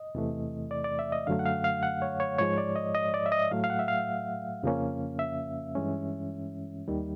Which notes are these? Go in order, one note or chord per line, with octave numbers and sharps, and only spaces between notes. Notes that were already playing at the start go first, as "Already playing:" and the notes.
Already playing: D#5
E2 C3 E3 A3
D5
D5
E5
D#5
F#2 D3 F#3 A3 F5
F#5
F5
F5
F#5
C#5
C#5
G#2 F3 G#3 C#5
D5
D#5
D#5
D5
E5
D#5
A2 F#3 A3 F5
F5
F#5
E5
F5
F2 C#3 F3 A#3 C#4
E5
G2 E3 G#3 C#4
D#2 D#3 G3